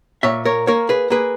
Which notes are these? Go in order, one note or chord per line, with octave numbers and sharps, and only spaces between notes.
A#2 C#5 E5
A#4 C#5
A#3 A#4 C#5
G#4 B4
A#3 G#4 B4